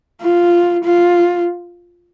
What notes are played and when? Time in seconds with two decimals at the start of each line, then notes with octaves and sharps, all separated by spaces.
0.21 F4
0.84 F4